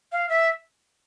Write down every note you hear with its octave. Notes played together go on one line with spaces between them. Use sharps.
F5
E5